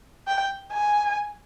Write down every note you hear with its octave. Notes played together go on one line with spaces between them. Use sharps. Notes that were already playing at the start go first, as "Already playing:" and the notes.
G5
G#5